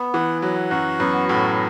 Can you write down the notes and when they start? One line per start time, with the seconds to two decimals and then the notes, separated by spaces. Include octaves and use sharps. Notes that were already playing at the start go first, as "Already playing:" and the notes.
Already playing: B3
0.14 E3 F#5
0.42 F#3 F#5
0.71 F#2 F#4
0.99 F#2 B3
1.29 A2 F#4